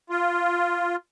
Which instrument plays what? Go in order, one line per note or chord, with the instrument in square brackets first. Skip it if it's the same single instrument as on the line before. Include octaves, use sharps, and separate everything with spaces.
[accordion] F4